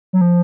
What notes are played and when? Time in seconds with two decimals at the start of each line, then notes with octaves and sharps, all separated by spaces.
0.13 F#3
0.21 F3